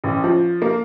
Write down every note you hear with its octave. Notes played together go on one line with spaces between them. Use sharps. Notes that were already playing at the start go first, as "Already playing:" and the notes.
A1
F3
A#3